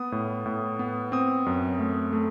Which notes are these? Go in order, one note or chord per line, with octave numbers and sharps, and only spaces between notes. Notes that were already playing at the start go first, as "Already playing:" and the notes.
Already playing: B3 D#6
A2
A2
B3
C4 D#6
F#2
A3
A3